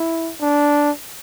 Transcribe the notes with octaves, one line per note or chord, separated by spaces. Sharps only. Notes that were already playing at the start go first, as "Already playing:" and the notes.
Already playing: E4
D4